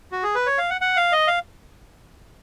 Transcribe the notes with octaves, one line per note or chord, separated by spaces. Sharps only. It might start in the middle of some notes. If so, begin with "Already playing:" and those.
F#4
G#4
B4
C#5
F5
F#5
F#5
F5
D#5
F5